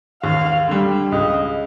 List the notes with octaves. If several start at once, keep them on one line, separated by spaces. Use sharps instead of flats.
D#2 F5
D3 G3
C#2 D#5